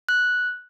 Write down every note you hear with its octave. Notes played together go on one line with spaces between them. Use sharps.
F#6